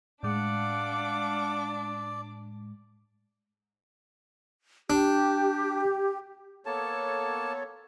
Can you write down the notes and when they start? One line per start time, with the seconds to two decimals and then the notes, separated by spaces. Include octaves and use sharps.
0.23 A2 G#3 D4 D5 F5 F#5 D6
4.90 D4 G4
6.66 A#3 B3 A4 C#5 A5